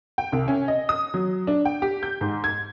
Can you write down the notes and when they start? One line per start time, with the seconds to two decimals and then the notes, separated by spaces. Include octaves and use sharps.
0.18 G5
0.32 C2
0.48 C#4
0.68 D#5
0.89 D#6
1.14 F#3
1.47 D4
1.65 G5
1.82 G4
2.03 G6
2.21 G#2
2.44 G#6